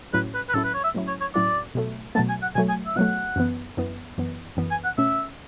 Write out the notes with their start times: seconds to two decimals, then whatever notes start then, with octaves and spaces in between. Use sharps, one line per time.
0.13 A2 F#3 C#4 E4 B4
0.35 B4
0.49 B4
0.54 A2 F#3 C#4 E4 A4
0.64 B4
0.74 C#5
0.84 E5
0.95 A2 F#3 C#4 E4
1.08 C#5
1.21 C#5
1.35 A2 F#3 C#4 E4 D5
1.75 B2 F#3 A3
2.15 B2 F#3 A3 A5
2.29 G#5
2.42 F#5
2.55 B2 F#3 A3 G#5
2.69 G#5
2.87 E5
2.96 B2 F#3 A3 F#5
3.36 F#2 E3 B3
3.77 F#2 E3 B3
4.18 F#2 E3 B3
4.57 F#2 E3 B3
4.71 G#5
4.85 F#5
4.98 B2 A3 C#4 E5